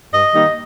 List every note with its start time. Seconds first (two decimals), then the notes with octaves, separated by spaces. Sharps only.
0.12 G2 D#5
0.34 D#3 G3 A#3 D#4